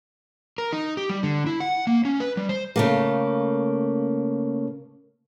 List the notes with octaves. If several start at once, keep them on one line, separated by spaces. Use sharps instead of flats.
A#4
D#4
G4
G3
D3
E4
F#5
A#3
C#4
B4
G3
C5
C#3 A3 A#3